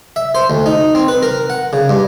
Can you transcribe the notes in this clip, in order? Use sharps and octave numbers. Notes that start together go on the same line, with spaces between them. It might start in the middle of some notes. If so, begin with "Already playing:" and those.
E5
C5
D2
D#4
C4
B4
A#4
F#5
C#3
G2